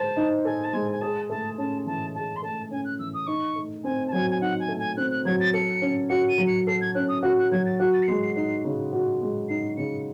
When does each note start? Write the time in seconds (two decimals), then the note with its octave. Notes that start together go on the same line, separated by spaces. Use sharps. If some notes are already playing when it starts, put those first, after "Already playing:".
Already playing: G#3 C5 A5
0.17 D#4
0.45 A4 G#5
0.64 A5
0.73 G#3 G#5
0.91 G#5
1.01 G#4 A5
1.29 A3 A5
1.58 C#4 A5
1.86 E3 A5
2.15 G#4 A5
2.36 C6
2.42 A3 A5
2.71 C#4 G#5
2.85 F#6
2.99 E3 E6
3.14 D#6
3.27 D#4 C#6
3.56 A3
3.84 C4 G#5
4.08 A5
4.12 F#3 G#5
4.30 G#5
4.41 D#4 F#5
4.59 G#5
4.68 A3
4.79 G#5
4.97 C4 F#6
5.11 F#6
5.25 F#3 G#6
5.40 A6
5.53 A4 C#7
5.82 C#4
6.09 F#4 C#7
6.29 D#7
6.38 F#3
6.47 C#7
6.67 A4 C7
6.81 G#6
6.95 C#4 F#6
7.08 D#6
7.22 F#4 F#6
7.38 F#6
7.51 F#3 G#6
7.65 A6
7.79 F#4 F#6
7.94 A6
8.03 C#7
8.08 G#3 C7
8.22 C7
8.36 D#4 C7
8.65 C#3
8.93 F#4
9.21 G#3
9.49 D#4 C7
9.77 C#3 C#7